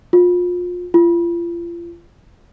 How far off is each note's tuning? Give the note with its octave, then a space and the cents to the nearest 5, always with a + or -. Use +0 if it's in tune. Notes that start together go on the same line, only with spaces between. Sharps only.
F4 +30
F4 -35